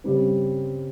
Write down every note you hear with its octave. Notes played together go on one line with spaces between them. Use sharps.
C#3 G3 C4